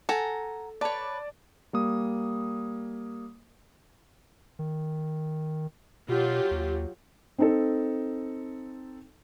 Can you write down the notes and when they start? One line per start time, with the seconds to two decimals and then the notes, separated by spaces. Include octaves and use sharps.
0.09 A4 F#5 G#5 A#5
0.81 B4 C#5 D5 A5
1.73 G3 A#3 D#6
4.59 D#3
6.09 B2 F#3 F4 G4
6.51 D#2
7.38 C4 D#4 A4